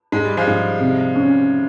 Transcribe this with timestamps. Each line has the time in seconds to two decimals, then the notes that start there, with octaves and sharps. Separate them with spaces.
0.12 G#2 G#3
0.25 G3
0.37 F3 G#3
0.47 G#2
0.80 C3
1.16 C#4